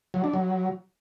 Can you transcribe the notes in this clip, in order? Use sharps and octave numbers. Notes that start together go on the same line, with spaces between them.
F#3
D4
F#3